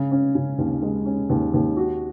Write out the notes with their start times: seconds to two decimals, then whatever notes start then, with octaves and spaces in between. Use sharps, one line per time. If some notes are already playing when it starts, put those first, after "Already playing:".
Already playing: C#3
0.11 C#4
0.35 C#3
0.58 D#2
0.82 G#3
1.05 C#4
1.30 D#2
1.54 D#2
1.77 F#4